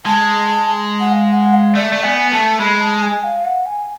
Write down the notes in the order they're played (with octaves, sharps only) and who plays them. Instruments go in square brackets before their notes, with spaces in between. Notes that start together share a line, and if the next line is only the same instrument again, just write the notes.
[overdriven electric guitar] G#3 [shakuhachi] A5
[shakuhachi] F#5
F5
F#5
F5
[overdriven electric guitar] A3 [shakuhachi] D5
[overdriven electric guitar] A3
[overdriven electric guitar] B3 [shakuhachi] G#5
[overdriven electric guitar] A3 [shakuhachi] A5
[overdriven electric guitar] G#3 [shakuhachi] B5
[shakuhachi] A5
G#5
F5
F#5
G#5